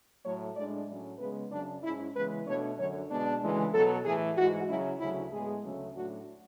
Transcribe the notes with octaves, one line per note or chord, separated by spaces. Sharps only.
A2 F#3 A3 C#5
A2 G#3 D4 D5
A2 F#3 C#4
C#3 G#3 B3 B4
F#2 C#3 F#3 D4
G#2 G#3 C#4 E4
C#3 E3 G#3 B3 B4
B2 A3 D4 C#5
F#2 D3 F#3 C#5
B2 G#3 B3 D4
D2 C#3 E3 G#3
B2 F#3 B3 A4
A2 E3 A3 G#4
G#2 E3 G#3 F#4
C#3 F#3 C#4 E4
D2 C#3 F#3 C#4 E4
A2 G#3 B3 G#4
D2 C#3 F#3 A3 C#4
A2 F#3 A3 D4 F#4